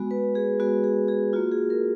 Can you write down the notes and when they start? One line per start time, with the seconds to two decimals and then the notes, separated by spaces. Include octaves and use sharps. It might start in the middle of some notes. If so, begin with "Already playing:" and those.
Already playing: G#3 B3 F#4
0.11 B4
0.35 G#4
0.60 G#3 B3 F#4
0.84 G#4
1.08 G#4
1.33 A#3 F4 F#4
1.51 G#4
1.70 A#4